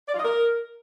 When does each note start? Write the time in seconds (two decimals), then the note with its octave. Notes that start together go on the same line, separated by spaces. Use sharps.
0.08 D5
0.14 F4
0.19 D#5
0.24 A#4